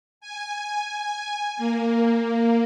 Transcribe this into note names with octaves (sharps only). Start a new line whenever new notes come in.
G#5
A#3